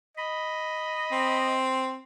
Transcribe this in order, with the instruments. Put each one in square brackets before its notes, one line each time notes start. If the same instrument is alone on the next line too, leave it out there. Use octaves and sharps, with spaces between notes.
[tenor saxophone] D#5 [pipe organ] B5
[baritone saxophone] C4